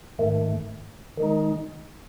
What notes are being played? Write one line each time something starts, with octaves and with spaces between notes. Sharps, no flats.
G#2 D#3 A3
D#3 G#3 D#4